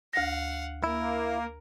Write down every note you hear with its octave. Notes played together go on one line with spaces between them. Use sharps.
D2 F5 F#5 A#6
A#3 E4 A#4